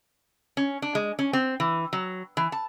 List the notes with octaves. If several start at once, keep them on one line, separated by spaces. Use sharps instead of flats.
C#4
D4
G#3
C#4
C4
E3
F#3
E3
A5